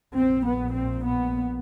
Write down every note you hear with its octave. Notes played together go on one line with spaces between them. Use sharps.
A#1 A#2 C4
B3
C4
B3